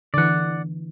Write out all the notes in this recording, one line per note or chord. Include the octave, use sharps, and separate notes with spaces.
D3 E3 D5 F#5